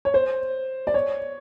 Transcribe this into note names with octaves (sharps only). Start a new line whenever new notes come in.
C#5
C5
D5
C#5